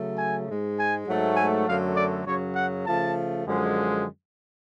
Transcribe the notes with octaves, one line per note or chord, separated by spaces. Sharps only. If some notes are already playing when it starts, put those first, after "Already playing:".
Already playing: C#3 F#3 A3
G#5
G#2 G#3
G#5
G#2 F#3 A3
G#5
F#2 D3 F#3 A3 F5
D5
F#2 C#3 F#3 C#5
F#5
C#3 F3 A3 A5
F#2 D3 F3 G#3